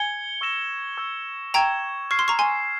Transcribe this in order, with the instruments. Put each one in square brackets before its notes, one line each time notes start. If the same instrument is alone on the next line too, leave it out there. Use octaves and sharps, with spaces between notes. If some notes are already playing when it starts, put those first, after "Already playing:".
Already playing: [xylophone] G#5 [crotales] G#6 C#7 G7
[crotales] C#6 E6 A#6 E7 G7
C#6 E6 G#6
[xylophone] G5 A#5 [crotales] C#6 E6 G#6 E7
[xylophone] C#6 [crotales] F6 G#6 C7
[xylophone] C6
A#5 C#6
G#5 C6